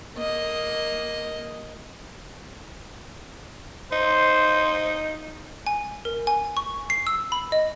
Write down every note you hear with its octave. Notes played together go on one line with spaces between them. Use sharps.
A#3 D#5
D#4 C5
G#5
A#4
G#5
C#6
C7
E6
B5
D#5